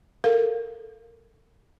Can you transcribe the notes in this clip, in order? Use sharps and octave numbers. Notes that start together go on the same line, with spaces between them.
A4 A#4 F5